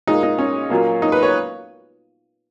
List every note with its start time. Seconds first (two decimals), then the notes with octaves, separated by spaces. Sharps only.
0.07 A#2 G#3 D#4
0.23 D#4
0.38 C#4
0.70 A#2 F#3 A#3
1.02 D#4
1.12 B4
1.23 C#5